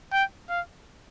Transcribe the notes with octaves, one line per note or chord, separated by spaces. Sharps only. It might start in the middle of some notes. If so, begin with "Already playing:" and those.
G5
F5